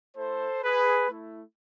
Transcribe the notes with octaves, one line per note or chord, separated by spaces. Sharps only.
A3 E4 A4 C5
G#4 B4
A3 E4